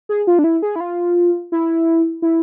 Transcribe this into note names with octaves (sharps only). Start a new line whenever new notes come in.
G#4
F4
D4
E4
G#4
E4
F4
E4
E4